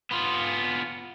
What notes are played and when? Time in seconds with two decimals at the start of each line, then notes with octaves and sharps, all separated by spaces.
0.11 B3 F4